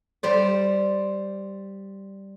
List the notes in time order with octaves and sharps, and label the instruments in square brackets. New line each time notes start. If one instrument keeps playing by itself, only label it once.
[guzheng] G3 C5 D5